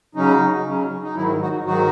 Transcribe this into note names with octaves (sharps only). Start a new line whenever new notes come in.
C#3 F#3 C#4 D#4
C#3 F#3 C#4
D#4
G#2 D#3 F#3 E4
D#4 F#4
G#2 D#3 F#3 D#4 F#4